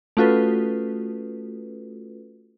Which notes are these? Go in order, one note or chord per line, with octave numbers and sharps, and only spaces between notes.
A3 C#4 F4 F#4 A4 B4